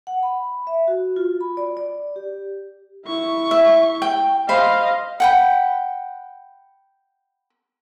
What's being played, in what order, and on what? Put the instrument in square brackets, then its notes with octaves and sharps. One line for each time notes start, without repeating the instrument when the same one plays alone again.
[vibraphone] F#5
B5
E5
F#4
F4
B5
D5
D5
G4
[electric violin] E4 C#6
[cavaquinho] E5
G5
[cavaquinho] C5 B5 [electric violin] D#5 F5
[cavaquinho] F#5 G5 B5